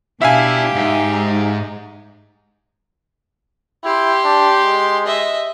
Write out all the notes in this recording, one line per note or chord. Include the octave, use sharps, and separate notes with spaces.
B2 D4 E4 G4 E5 F5 G#5
G#2 G#3 D#4
E4 G4 C6
D4
G#3
D#5 E5